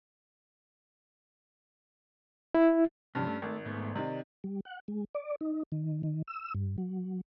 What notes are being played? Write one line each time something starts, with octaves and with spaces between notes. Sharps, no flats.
E4
G2 C3 E3 F3 C#4
A3
G#1 A3
G#2 A3 B3
C3 D#3 D5
G3
F#5
G#3
D5
D#4
D#3
D#3
E6
G2
F#3